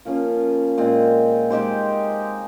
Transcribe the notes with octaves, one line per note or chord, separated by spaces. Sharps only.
F3 A#3 C#4 F4
A#2 G#3 C4
G#3 D#4 G4 C5